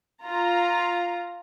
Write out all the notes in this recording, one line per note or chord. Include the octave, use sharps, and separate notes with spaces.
F4 A#5